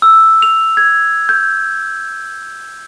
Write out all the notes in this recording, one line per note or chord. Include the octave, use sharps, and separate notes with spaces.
E6
F7
G#6
G6